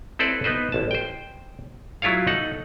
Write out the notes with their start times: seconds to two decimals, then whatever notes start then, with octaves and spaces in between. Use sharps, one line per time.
0.19 C4 E4 A4 B4 C5 D5
0.44 B3 D#4 B4 C5
0.72 A1 A5
0.91 C5 G5
2.02 F#3 E4 F4 C#5 F5
2.27 D#4 A4 F#5